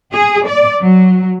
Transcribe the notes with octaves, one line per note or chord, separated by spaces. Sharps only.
G#4
D5
F#3